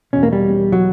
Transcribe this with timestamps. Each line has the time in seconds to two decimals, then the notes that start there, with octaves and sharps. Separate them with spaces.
0.13 E2 B2 C#4
0.23 A#3
0.33 G3
0.72 F#3